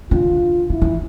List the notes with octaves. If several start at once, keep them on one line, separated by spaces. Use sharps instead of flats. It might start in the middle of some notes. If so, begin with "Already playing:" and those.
D3 F4
D3 E4
E3